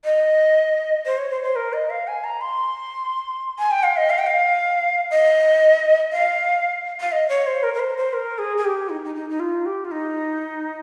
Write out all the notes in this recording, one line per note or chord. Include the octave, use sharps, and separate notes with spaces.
D#5
C5
C#5
C5
C5
A#4
D#5
F5
G#5
A#5
C6
G#5
G5
F5
D#5
F5
G5
F5
D#5
F5
F5
D#5
C#5
C5
A#4
A#4
C5
C5
A#4
G#4
G#4
G4
D#4
D#4
D#4
D#4
F4
G4
F4
D#4